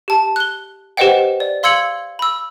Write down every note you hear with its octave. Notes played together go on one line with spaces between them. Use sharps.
G4 A5
F#6 G7
G4 B4 C5 D#5 F#5 G5
D5
F5 C6 E6 G#6 C#7 F#7
B5 E6